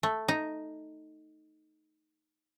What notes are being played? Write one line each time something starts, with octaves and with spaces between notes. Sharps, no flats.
A3
D#4